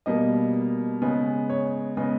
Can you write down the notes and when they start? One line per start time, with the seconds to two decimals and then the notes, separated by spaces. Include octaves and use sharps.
0.06 B2 G3 A#3 D#5
1.02 C#3 G#3 B3
1.50 C#5
1.97 C#3 G#3 B3 D#5